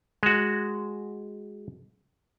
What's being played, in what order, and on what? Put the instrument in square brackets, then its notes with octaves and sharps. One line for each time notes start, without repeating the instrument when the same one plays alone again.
[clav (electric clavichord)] G#3 F#4